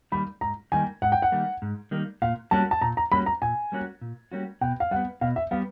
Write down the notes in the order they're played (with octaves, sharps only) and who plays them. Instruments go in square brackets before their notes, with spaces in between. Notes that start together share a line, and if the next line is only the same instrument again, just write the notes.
[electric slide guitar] D#3 G3 A#3 [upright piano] B5
[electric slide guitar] G#2 [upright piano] A#5
[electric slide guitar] D#3 G3 A#3 [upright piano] G#5
[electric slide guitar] G#2 [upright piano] F#5
[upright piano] G5
F#5
[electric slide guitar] D#3 G3 A#3
G#2
D#3 G3 A#3
[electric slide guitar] A#2 [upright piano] F5
[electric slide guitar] G3 A#3 C#4 F#4 [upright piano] A5
[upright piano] A5
[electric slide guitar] A#2 [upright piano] A#5
[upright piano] A#5
[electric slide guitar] G3 A#3 C#4 F#4 [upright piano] B5
[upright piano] A#5
[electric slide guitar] A#2 [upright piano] G#5
[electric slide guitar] G3 A#3 C#4 F#4
A#2
G3 A#3 C#4 F#4
[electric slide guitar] B2 [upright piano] G5
[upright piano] F5
[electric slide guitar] G3 [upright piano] F#5
[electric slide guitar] B3
[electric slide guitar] B2 [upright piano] F5
[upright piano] E5
[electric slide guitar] G3 B3 [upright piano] F5